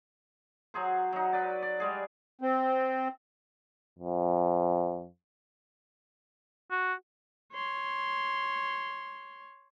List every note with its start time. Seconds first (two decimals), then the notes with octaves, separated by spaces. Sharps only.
0.74 F#3 G#4 C5
1.13 F#3 D#4
1.33 B4 D5
1.62 D5
1.80 G3 G#3 G#4
2.41 C4
3.99 F2
6.71 F#4
7.53 C#5 C6